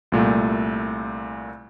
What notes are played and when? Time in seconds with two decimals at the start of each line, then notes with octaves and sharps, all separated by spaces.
0.12 C2 A#2 A3